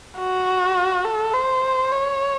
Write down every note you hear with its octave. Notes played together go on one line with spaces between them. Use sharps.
F#4
A4
C5
C#5